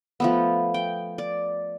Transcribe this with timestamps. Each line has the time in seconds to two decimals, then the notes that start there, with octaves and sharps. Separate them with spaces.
0.20 F3 A3 B3
0.74 G5
1.18 D5